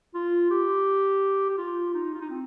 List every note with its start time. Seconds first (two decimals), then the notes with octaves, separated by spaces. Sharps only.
0.14 F4
0.51 G4
1.49 G4
1.58 F4
1.94 D#4
2.14 F4
2.21 D#4
2.30 C4